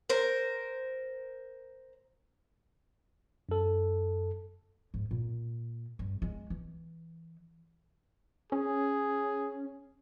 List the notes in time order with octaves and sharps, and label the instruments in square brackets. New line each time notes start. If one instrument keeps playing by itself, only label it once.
[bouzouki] A#4 C5
[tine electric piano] F#2 A4
[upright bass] G#2
A#2
G2
G#3
E3
[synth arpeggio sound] C#4 [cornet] G#4